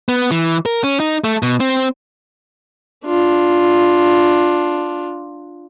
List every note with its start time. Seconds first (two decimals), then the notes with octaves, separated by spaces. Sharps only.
0.09 B3
0.31 E3
0.66 A#4
0.84 C#4
1.00 D#4
1.24 A3
1.43 B2
1.60 C4
3.05 D4 F4